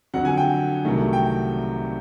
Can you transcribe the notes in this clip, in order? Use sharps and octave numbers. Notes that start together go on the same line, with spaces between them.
F2 D3 F#3 F#5
G#5
G5
C2 C3 D#3 F#3 A3
G5